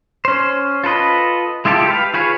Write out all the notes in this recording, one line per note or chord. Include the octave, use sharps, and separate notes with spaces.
C#4 C5
F4 A4 B4 D#5
G#3 E4 F4 G4 A4
G4 B4 F5
F4 F#4 G#4 B4 C#5